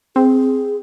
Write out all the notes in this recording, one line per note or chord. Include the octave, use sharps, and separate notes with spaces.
C4 G#4